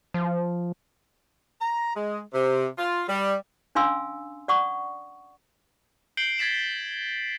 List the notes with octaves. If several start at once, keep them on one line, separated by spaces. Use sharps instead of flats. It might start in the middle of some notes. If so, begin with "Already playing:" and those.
F3
A#5
G#3
C3
F4
G3
C#4 D4 F5 G#5 C6 E6
D5 F#5 C#6 D#6
G6 C7 D7 F#7 G7
G#6 A6 B6 E7 F#7